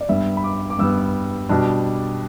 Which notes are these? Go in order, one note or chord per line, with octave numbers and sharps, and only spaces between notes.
D5
G2 G3 B3 E5
B5
D6
D6
G2 G3 B3 E6
B2 G3 D4